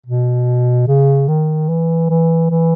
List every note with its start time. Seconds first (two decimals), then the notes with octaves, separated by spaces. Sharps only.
0.06 B2
0.88 C#3
1.28 D#3
1.69 E3
2.10 E3
2.50 E3